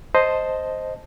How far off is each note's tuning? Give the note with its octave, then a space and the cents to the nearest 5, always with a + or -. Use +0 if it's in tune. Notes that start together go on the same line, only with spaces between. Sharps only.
C5 +0 D#5 +0 A5 +0